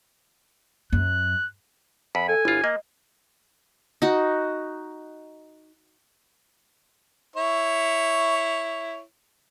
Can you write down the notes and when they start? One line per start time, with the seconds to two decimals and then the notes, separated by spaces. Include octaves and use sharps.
0.92 F#2 F#6
2.15 F2 B5
2.29 A4 G#5
2.45 G1 E4 F4
2.64 A#3 D#5
4.02 D#4 F#4
7.36 E4 C#5